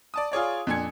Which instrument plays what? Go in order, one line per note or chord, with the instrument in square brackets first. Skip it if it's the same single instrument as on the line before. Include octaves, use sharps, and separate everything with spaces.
[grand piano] D5 A5 D#6
F4 G#4 C#5 D5
F2 A#2 D4 G#5 G#6 C#7